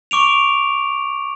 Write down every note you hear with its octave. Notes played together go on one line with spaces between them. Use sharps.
C#6 D6 D7 F7